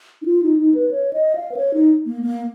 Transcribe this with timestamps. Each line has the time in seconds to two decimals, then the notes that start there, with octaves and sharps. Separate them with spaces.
0.22 D#4
0.26 F4
0.43 D#4
0.58 D#4
0.75 B4
0.91 C#5
1.13 D#5
1.35 F5
1.52 B4
1.57 C#5
1.74 D#4
2.06 A#3
2.22 A#3